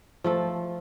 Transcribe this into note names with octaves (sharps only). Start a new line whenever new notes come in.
F3 A3 A4